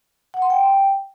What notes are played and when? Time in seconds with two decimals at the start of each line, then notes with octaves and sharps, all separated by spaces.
0.34 F#5
0.42 C6
0.50 G5